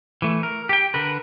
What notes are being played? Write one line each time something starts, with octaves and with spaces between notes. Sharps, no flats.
E3 A3
A#4
G4 G5
D3 A#4 B4